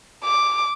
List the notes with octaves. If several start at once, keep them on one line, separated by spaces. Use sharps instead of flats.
D6